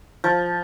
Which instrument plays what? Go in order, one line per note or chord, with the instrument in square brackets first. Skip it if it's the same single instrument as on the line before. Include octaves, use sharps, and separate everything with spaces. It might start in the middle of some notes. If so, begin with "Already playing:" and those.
[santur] F3